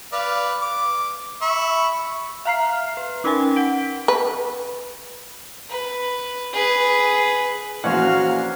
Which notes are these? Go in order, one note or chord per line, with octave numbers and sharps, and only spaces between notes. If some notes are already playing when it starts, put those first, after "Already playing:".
B4 D5 F5
D6
E5 B5 C#6
E5 F5 A#5 F6 C7
B4
C#4 D#4 A#4 B4 G5 G#5
F#5 B6 D7
B4
B4
G#4 B4
A#1 E3 A#3 C#4 F#4 C5 F5 F#5